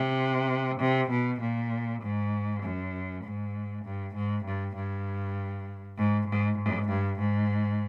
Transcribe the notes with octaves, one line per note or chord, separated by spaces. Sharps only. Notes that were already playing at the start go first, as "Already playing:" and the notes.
Already playing: C3
C3
B2
A#2
G#2
F#2
G#2
G2
G#2
G2
G2
G#2
G#2
G#2
G2
G#2